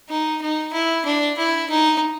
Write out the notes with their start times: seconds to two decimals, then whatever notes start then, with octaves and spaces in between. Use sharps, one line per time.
0.09 D#4
0.42 D#4
0.74 E4
1.05 D4
1.38 E4
1.70 D#4